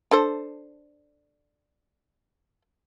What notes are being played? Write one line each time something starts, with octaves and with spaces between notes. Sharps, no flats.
D4 A4 C5